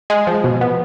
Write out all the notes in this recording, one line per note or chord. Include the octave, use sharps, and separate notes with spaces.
G#3
F3
B2
B3